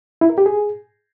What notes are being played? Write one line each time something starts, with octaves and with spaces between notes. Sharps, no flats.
E4
A#4
G4
G#4